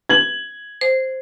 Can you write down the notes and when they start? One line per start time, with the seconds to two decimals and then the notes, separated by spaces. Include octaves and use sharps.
0.09 G#6 F#7
0.81 C5